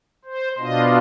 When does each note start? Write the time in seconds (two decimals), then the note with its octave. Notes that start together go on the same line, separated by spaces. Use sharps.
0.25 C5
0.58 B2 B3 D4 F4 D#5